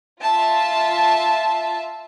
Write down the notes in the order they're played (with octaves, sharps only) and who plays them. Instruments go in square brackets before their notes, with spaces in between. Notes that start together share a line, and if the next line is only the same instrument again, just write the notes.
[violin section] F4 E5 A5